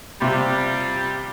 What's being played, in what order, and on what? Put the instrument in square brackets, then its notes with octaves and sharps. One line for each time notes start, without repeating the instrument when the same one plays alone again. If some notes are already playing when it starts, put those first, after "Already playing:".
[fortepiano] C3 [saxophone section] G3 F4